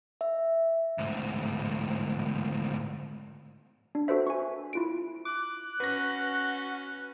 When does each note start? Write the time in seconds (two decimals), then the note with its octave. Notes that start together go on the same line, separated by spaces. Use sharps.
0.21 E5
0.98 D2 G#2
3.95 D4
4.08 F#4 A4 B4 C5 E5
4.27 G#5 C#6
4.73 E4 F4 D7
5.25 D6 F#6
5.80 C#4 F#4 B4 A#6